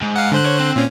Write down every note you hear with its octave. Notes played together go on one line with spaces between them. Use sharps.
G#2
F5 F#5
D3 C5 F#6
C#5
C4
A#2 C#4